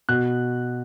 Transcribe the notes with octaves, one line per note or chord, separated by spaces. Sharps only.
B2 F#6